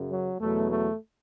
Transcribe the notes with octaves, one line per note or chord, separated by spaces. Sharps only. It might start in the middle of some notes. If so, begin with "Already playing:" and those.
Already playing: F#2 C#3
F#3
E2 B2 F#3 A3
A3